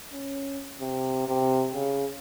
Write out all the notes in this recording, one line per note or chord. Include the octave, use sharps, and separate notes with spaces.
C#4
C3
C3
C#3